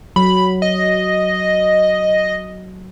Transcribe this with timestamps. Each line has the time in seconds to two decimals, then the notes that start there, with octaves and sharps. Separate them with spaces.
0.16 F#3 B5
0.62 D#5